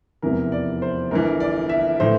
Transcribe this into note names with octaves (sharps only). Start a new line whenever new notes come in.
F1 E2 C3 E3 A#4
D5
C5
G1 G2 E3 A#4
D5
E5
A2 E3 C5